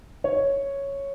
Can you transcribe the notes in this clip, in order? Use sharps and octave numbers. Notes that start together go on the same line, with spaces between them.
C#5